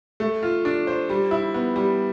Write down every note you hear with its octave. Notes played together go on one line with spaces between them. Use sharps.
A3
F4
D4
C5
G3
E4
B3
G3